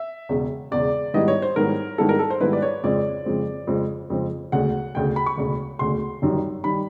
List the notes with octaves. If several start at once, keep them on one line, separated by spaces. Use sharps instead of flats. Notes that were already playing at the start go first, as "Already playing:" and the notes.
Already playing: E5
E1 E2 C#3
E1 E2 C#3 D5
G#2 D#3 G3 B3 E4 D#5
C#5
C5
G#2 D#3 G3 B3 E4 A#4
G#2 D#3 G3 B3 E4 A4
A#4
A4
C5
G#2 D#3 G3 B3 E4 B4
D5
C#5
F2 C#3 F3 G#3 C4 D5
F2 C#3 F3 G#3 C4
F2 C#3 F3 G#3 C4
F2 C#3 F3 G#3 C4
E1 D2 C#3 F#5
E1 D2 C#3 G5
B5
C#6
E1 D2 C#3
E1 D2 C#3 C6
G1 F#2 D#3 G3
D#3 G3 B5